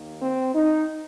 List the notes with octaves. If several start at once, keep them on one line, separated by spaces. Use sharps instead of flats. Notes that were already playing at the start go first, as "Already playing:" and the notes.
Already playing: D#2 D#3 A#3
C4
D#4